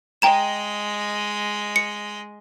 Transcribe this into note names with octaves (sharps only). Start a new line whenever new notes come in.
G#3 D#5 G5 A#5 E7
C#7